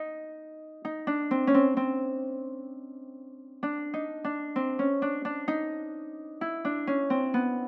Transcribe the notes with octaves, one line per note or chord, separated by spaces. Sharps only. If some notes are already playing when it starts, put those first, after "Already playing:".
Already playing: D#4
D#4
D4
C4
C#4
C4
C4
D4
D#4
D4
C4
C#4
D4
D4
D#4
E4
D4
C#4
C4
B3